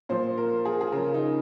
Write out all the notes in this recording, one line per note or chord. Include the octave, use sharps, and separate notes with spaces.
A#2 F3 C5
A#4
G#4
G#4
C#3 F3 A#4
D#4